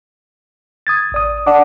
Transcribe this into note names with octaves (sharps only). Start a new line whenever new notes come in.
D#6 G#6 A6
A1 D5 D#6
D4 F#5 D6